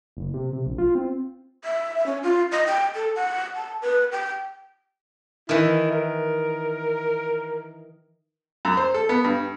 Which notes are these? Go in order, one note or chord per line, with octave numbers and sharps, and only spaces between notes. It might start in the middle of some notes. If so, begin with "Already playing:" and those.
F#1
C3
C3
A#1
F4
C4
E5
C#4
F4
D#5
G5
A4
F#5
A5
B4
G5
D#3 E3 E4
A#4
F#2
C5
A4
B3
G2